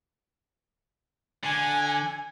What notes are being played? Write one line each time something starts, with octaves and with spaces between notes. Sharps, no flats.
D3 G#5